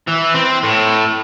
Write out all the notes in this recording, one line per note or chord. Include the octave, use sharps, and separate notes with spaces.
E3
C4
A2